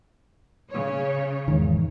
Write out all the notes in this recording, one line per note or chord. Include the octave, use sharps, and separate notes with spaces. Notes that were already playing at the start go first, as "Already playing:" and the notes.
C#3 C#5
E2 G#2 D#3